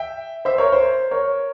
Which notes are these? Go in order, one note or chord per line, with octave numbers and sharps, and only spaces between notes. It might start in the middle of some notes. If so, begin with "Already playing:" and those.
Already playing: E5 G5
C5 E5
A#4 C#5
C5
A#4 C#5